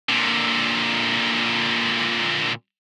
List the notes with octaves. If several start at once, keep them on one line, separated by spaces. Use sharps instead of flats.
A#2 D3